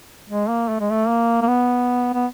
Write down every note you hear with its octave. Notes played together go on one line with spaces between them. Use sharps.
G#3
A#3
A3
G#3
A3
A#3
A#3
B3
B3